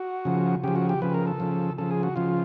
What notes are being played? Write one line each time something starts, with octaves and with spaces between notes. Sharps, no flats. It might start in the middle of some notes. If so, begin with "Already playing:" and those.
Already playing: F#4
C#3 F3
C#3 F3 G4
F#4
G4
C#3 F3 B4
A#4
A4
C#3 F3
C#3 F3 A4
G#4
F#4
C#3 F3 F4